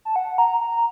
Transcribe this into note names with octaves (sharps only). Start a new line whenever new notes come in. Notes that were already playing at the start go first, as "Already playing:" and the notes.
A5
F#5
A#5
A#5